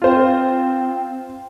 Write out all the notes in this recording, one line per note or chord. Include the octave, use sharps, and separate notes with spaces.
C4 F4 C5